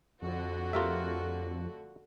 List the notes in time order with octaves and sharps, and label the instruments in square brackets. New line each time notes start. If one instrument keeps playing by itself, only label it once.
[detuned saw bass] F2 [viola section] D3 F#4
[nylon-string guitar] A3 G4 C#5 [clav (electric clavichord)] F4 A#4 E5